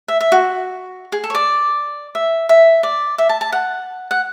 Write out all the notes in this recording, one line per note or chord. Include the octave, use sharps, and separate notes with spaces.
E5
E5
F#4
G#4
A4
C#5
D5
E5
E5
D5
E5
A5
A5
F#5
F#5